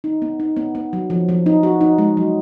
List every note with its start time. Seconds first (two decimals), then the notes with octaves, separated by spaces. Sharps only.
0.04 D#4
0.22 B3
0.40 D#4
0.56 B3
0.75 B3
0.93 F#3
1.10 F3
1.29 F3
1.46 D#4
1.63 F#4
1.81 D#4
1.98 G#3
2.17 F#3